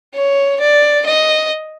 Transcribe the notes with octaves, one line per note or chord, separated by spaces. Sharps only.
C#5
D5
D#5